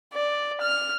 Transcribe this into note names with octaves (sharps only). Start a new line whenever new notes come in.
D5
F6